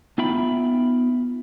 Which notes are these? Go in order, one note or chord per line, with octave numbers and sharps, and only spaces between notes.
B3 D#4 F4 E5 G5 B5